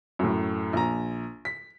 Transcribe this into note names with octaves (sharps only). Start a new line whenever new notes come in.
F#2 A2
A#1 A#5
B6